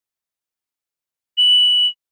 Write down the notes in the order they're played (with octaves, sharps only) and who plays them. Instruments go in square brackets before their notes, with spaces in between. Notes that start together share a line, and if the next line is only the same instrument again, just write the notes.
[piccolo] F#7